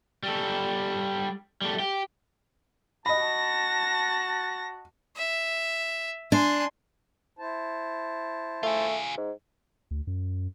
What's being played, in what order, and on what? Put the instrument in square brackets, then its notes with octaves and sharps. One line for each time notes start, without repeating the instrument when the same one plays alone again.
[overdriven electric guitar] G3 A4
G3 A3
G4
[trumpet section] F#4 A5 [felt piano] D#5 B5 [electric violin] A#6
[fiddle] E5
[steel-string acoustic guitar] D4 [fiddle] G#5 C6
[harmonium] E4 C5 A5
[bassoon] A3 [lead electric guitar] F4 G#4
[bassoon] G#2
[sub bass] D2
F#2